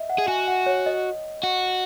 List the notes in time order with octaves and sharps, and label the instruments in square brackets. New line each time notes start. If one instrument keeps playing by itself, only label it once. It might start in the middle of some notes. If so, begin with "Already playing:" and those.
Already playing: [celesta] D#5 E5
F#5
[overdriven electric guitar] G#4
[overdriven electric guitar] F#4 [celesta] G#5
[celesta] F#5
C#5
D#5
[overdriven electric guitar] F#4